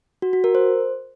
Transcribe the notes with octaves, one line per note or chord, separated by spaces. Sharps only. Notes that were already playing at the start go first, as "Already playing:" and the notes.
F#4
F#4
A#4
C5